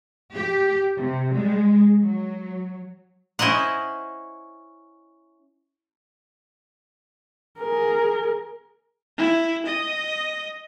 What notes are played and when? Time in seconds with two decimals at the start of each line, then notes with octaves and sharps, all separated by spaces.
0.34 G4
0.97 C3
1.34 G#3
2.01 F#3
3.39 C#4 E4 C5 D#5 F#5
7.59 G#4 A#4
9.18 E4
9.66 D#5